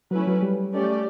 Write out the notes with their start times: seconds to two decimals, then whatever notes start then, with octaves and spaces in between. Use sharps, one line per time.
0.11 F#3 A3 C#4 E4 B4
0.27 F#3
0.42 G3
0.72 A3 C#4 G4 D5